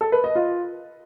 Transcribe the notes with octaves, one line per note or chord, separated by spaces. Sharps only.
A4
B4
D#5
F4